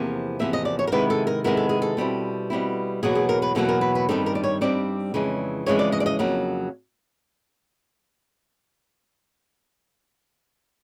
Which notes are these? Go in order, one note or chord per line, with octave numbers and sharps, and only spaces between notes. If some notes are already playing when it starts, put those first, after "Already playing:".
Already playing: E2 C3 F3 A#3
E2 C3 F3 A#3 E5
D#5
D5
C#5
A#4
C3 D#3 G#3 B3 E4 B4
A4
A#4
C3 D#3 G#3 B3 E4 A#4
A4
G#4
A4
B2 G3 C4 E4
B2 G3 C4 E4
E2 B2 F#3 A#3 G#4
G#4
A#4
B4
E2 B2 F#3 A#3 A4
A#4
B4
B4
G2 D#3 G3 C4 D#4 A4
A#4
D5
C#5
G2 D#3 G3 C4 D#4 D5
F2 C#3 E3 G#3 C#4
F2 C#3 E3 G#3 C#4 C#5
D5
D#5
D5
D#5
F2 C#3 F#3 A#3